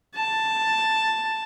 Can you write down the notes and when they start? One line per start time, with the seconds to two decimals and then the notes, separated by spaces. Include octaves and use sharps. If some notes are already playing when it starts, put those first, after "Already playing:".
0.15 A5